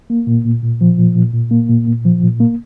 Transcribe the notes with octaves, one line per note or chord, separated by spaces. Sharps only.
A#3
A#2
A#2
A#2
F3
A#2
A#2
A#2
A#3
A#2
A#2
F3
A#2
A#3